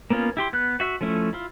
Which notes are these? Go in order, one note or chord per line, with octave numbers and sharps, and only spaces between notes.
A#3 B3 C#4 F4
E4 G4 C6
B3 F#6
F#4 E5
F3 A3 C#4 E4
E4 F4